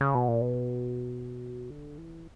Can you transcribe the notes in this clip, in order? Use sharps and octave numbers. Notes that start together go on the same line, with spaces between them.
C#3
B2
A#2
B2
D3
E3